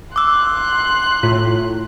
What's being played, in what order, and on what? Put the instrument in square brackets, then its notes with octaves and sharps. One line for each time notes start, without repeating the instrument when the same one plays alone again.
[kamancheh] C6 F#6 [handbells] D6 E6
[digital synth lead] A2 [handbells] F4